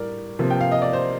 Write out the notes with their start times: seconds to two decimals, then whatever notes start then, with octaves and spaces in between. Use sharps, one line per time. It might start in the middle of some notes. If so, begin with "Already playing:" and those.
Already playing: A2 G3 A#4 D5
0.39 C3 F3 A#3
0.50 G5
0.61 F5
0.72 D#5
0.82 D5
0.93 C5